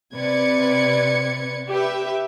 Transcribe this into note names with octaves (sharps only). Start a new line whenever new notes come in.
C3 B4 D5 G#6 C#7
G4 B4 E5